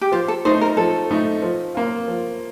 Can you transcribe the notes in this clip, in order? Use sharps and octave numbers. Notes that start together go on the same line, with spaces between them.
G4
F3 F4
A4
A3 D#4 C5
A#4
F3 A4
A3 D#4
F3
A#3 F4
F3